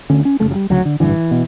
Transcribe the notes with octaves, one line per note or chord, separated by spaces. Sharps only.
D2 D3 C#4
C#4
F#1 E2 C#3 A3
F#3
G3
D2 C#3 F#3
D3
A1 G2 D3 E3
B2